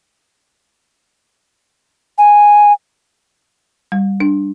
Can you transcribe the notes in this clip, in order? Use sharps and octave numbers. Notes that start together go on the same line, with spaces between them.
G#5
G3
D4